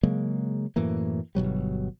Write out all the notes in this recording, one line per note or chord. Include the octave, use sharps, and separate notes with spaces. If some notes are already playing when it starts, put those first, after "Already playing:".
C#3 F#3 G#3 A#3
F#2 A2 E3 A#3
G1 B2 F#3 G3